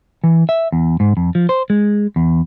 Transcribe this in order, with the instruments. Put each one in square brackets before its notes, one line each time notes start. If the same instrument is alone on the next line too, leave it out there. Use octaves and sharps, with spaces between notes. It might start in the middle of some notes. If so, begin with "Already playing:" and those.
[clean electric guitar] E3
E5
E2
G#2
F2
F3
C5
G#3
E2